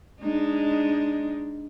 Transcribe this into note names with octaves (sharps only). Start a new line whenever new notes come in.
G#3 D4 D#4